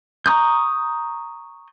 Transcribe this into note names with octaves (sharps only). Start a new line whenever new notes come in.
A#5 C#6 D#6 G6